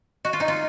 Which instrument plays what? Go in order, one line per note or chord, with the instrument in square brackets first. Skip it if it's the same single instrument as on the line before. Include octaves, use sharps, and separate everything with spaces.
[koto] F#4 [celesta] D#5
[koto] F4
[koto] D#4 [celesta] D#5
[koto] F4